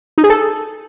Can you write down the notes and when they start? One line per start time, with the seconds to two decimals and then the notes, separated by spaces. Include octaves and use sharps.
0.18 D#4
0.24 G#4
0.30 A4